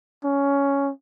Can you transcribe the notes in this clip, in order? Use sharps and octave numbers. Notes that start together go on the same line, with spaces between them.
C#4